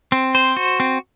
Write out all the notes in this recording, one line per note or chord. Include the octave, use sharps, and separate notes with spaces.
C4
C5
F#4
C4